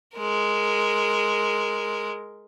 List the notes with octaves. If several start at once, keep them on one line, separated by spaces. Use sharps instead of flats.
G#3 A#4